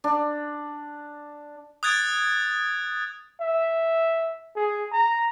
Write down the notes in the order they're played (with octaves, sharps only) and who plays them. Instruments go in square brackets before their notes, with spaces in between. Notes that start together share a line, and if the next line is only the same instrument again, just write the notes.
[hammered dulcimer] D4
[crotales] D#6 F#6 G#6 A6 D7
[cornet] E5
G#4
A#5